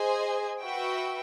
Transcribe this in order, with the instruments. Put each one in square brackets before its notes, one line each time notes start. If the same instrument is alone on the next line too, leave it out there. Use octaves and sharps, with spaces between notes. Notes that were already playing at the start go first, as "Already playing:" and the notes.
Already playing: [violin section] G#4 C5 D#5 G#5
F#4 B4 E5 G5